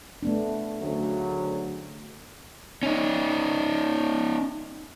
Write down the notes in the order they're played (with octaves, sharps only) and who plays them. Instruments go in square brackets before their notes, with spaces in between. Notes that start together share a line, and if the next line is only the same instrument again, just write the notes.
[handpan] A3 B3 D4
[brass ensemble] D2 C#3 F#3
[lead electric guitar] C#4 D#4